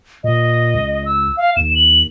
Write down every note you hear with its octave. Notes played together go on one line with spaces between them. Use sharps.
A#2 D#5
C#2
E6
F5
D#2 E7
F#7